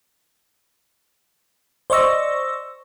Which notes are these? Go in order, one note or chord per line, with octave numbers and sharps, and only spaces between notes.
C5 D5 D#5 C#6 E6 A#6